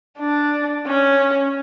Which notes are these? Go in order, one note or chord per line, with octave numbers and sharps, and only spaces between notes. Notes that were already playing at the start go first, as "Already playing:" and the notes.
D4
C#4